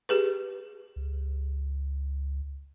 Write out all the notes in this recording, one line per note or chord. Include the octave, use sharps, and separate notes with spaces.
G4 G#4 B4
C#2